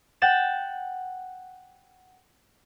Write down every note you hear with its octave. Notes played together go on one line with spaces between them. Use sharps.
F#5 G5 A6 E7